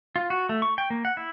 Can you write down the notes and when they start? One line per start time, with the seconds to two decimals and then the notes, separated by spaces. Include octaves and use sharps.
0.16 F4
0.30 F#4
0.49 A3
0.62 C#6
0.78 G5
0.90 A#3
1.05 F#5
1.17 E4